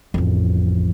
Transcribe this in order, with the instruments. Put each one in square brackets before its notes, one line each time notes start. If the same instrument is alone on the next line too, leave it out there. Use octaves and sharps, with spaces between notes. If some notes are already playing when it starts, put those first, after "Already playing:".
[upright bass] A1 F2